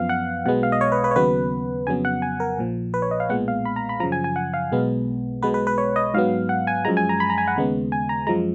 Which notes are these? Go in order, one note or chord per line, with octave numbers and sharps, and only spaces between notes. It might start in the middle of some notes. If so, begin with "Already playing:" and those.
Already playing: F#2 F3 B3 F5
F#5
B1 B2 G#3 B3 F#5
F5
D#5
C#5
B4
B4
C#5
D#2 C#3 F#3 B3 B4
F2 C#3 F#3 B3 G#5
F#5
G#5
A#4
A#1 A#2 F3
B4
C#5
D#5
F5
B1 A#2 G#3 B3 F#5
F5
B5
A#5
B5
F#2 C#3 F3 A#5
G#5
G#5
F#5
F5
B1 B2 G#3 B3
B1 B2 G#3 B3 B4
B4
B4
C#5
D#5
G#2 F#3 B3 F5
F#5
G#5
F#2 F3 G#3 A#5
G#5
A#5
B5
A#5
G#5
F#5
D#2 C#3 G#3 B3
G#5
A#5
F#2 F3 G#3 A#5